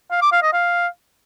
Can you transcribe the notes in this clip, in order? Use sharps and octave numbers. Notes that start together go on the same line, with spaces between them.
F5
D6
F5
D#5
F5